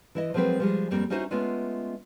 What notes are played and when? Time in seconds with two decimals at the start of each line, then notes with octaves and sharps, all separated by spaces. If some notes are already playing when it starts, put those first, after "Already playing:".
0.15 E3 E4 D#5
0.34 F3 F#3 G#3 C4 A#4 B4
0.60 F3 G3 G#3
0.91 F2 G3 A#3 C4
1.10 C#4 D#4 E4 F#4 C5
1.31 G#3 A3 B3 C#4 F4